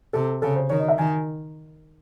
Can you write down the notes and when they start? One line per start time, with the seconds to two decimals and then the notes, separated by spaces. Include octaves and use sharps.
0.13 C3 A4
0.42 C#3 A4
0.56 C5
0.70 D#3 C#5
0.80 D#5
0.88 E5
0.98 D#3 G#5